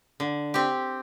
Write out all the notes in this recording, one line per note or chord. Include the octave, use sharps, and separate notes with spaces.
D3
C4 G4